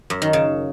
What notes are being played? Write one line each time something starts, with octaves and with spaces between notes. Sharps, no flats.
F#2
D#3
C#3